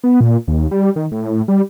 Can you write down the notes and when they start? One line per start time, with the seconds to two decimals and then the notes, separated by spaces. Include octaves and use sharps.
0.04 B3
0.21 A#2
0.48 D#2
0.71 G3
0.96 D#3
1.12 A2
1.48 G3